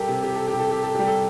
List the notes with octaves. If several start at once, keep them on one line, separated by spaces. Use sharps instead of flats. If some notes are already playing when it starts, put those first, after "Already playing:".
Already playing: G3 G4 A4 A#4
C3
G4
A4
G4
C3
A4
G4
A4
G3 G4
A4